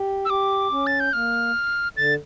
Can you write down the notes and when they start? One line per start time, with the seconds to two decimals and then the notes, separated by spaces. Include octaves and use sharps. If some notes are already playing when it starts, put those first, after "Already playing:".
Already playing: G4
0.25 E6
0.30 G4 D6
0.71 C#4
0.87 A6
1.00 G6
1.13 A#3 F6
1.97 D3 A6